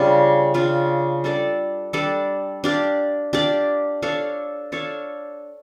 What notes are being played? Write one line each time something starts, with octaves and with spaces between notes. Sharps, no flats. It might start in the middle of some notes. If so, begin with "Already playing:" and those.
Already playing: C#3 G3 D4 F4
C#3 G3 D4 F4
G3 D4 A4 D5
G3 D4 A4 D5
D4 G4 D5 F5
D4 G4 D5 F5
D4 A4 C#5 F5
D4 A4 C#5 F5